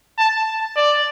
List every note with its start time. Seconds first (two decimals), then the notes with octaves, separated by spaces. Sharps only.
0.18 A5
0.76 D5